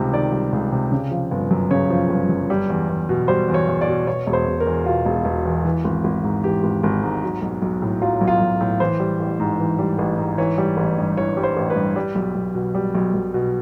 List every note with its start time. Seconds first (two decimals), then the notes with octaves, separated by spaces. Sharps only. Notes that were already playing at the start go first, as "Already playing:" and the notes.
Already playing: C#2 C3 D#3 G3
0.12 D#3 D5
0.32 G3
0.53 C#2
0.72 C3
0.92 C#3
1.11 F3
1.31 G1
1.51 F#2
1.71 C#3 C#5
1.90 F3
2.10 G1
2.29 F#2
2.50 G3
2.70 E2
2.89 E2
3.09 B2
3.28 G3 C5
3.48 E2
3.54 C#5
3.68 E2
3.81 D5
3.87 B2
4.07 B2 C#5
4.27 E1
4.33 C5
4.47 E1
4.60 A#4
4.67 E2
4.86 B2 F4
5.05 E1
5.25 E1
5.46 E2
5.65 E3
5.84 G#1
6.04 G#1
6.24 G#2
6.44 E3 G4
6.63 G#1
6.83 G#1
7.03 G#2
7.23 F#3
7.42 B1
7.62 B1
7.82 A2
8.01 F#3 F4
8.21 B1
8.27 F4
8.41 B1
8.61 A2
8.80 E3 C5
9.00 G3
9.20 A1
9.40 G#2
9.59 E3
9.79 G3
9.98 A1
10.18 G#2
10.38 E3 C#5
10.58 G3
10.77 A1
10.98 G2
11.17 E3 C#5
11.37 G3
11.43 C5
11.56 A1
11.70 B4
11.76 G2
11.96 G3
12.15 B1
12.35 B1
12.55 B2
12.75 G3
12.95 B1
13.14 B1
13.34 B2